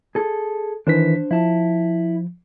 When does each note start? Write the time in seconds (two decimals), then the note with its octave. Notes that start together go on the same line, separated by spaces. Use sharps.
0.15 G#4 A4
0.87 D#3 E3 D4 C5 B6
1.31 F3 E4 A5